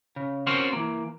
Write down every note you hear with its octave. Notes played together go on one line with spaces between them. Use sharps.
C#3
C4 C#4 F4 F#4 A#4 C5
E3 A#3